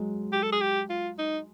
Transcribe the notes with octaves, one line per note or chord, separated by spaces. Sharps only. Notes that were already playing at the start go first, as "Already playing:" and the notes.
Already playing: F#3 G#3
G4
A4
G#4
G4
F4
D#4